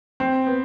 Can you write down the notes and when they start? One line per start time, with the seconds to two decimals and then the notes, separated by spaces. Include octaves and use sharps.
0.20 C4
0.47 B3